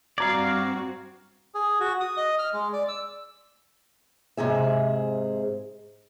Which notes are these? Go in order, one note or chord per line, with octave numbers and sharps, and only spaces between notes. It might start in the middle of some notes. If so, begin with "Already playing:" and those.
G2 C4 F#4 D5 F5 A#5 G#6
G#4
F#4
D#6
D#5
F6
G#3
D5
E6
G#2 C3 G#4 E5